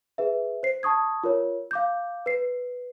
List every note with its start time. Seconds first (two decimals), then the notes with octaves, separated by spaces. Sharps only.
0.18 G#4 B4 E5
0.63 C5 C7
0.83 A5 C#6 D#6 G#6
1.24 F4 A#4 C#5
1.71 F5 D6 G6
2.26 B4 C7